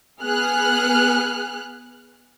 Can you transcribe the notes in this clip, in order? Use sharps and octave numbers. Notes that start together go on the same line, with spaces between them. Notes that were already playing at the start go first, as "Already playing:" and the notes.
B3 G#4 F6 F#6